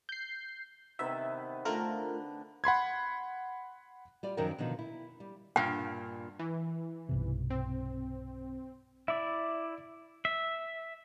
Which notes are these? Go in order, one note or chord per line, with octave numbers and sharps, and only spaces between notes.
G6 C7
C3 D#3 B3 E5
D3 A3 F4 A#4
F#5 B5 C6 G#6
G3 F4 D5
F#2 D#3 F3 F#3 A#4 G5
B2 D3 D#3 F3
E4
G3
G2 A#2 G5
E3
B1 G2 C3
C4
E4 D5 E5
E5